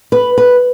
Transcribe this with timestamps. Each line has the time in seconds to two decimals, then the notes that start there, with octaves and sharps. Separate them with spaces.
0.12 B4
0.38 B4